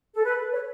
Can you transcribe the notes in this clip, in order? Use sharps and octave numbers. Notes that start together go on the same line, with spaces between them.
A4
B4
C#5